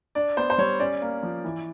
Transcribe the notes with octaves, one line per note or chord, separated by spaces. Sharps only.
D4 D5
B3 C5
C5
G3 C#5
C#4 D5
A#3
F3
E3